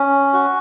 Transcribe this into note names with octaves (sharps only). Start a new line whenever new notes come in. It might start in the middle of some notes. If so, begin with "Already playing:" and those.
Already playing: C#4
F#4